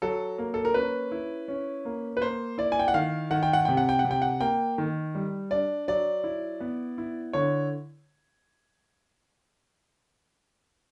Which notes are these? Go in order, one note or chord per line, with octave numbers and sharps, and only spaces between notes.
F#3 A4
A#3
A4
A#4
C#4 B4
E4
C#4
A#3
B4
A#3 C5
E4 D5
G#5
G5
F#5
D#3 F5
D#3 F#5
G5
F#5
C3 G5
F#5
G5
F#5
C3
G5
F#5
A#3 G5
D#3
G3
D4 D5
F#3 D5
E4
B3
E4
D3 C#5